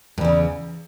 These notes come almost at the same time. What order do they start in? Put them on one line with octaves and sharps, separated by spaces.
G2 E2 C#3